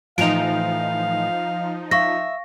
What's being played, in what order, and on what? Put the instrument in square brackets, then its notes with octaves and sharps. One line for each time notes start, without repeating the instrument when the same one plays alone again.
[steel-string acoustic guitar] A2 E3 [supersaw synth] F3 D#4 [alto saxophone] F5 [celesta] D7 F7
[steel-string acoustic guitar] E5 [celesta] F5 C#6 A#6